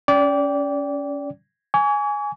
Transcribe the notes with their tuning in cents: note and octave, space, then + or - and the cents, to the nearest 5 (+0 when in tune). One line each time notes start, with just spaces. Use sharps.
C#4 +20 D5 -25 G5 +0
G#5 +0 C#6 +45